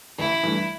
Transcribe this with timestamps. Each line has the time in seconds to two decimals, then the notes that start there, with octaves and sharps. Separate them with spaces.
0.19 A1 E4
0.43 G2 E3 A3